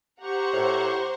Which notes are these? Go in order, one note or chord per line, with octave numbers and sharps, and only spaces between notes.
G4 C5 F#5 A#5 C#6
A2